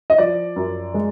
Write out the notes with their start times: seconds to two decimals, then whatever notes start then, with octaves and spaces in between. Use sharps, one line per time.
0.10 D#5
0.18 F3 D5
0.56 F#2
0.94 G#3